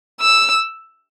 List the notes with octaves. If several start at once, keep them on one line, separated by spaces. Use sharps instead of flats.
E6